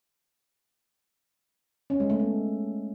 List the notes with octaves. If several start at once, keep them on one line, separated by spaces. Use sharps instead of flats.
C#4
G#3
A3
B3